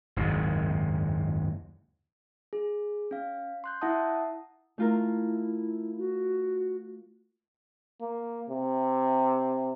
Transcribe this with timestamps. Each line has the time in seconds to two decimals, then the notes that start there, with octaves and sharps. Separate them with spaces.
0.16 F#1 D#2 G#2 C3
2.53 G#4
3.11 C#4 F5
3.64 C6 F#6 G6
3.81 E4 E5 F#5 A5 D#6
4.78 A3 E4 F4 A#4
5.98 F#4
8.01 A#3
8.50 C3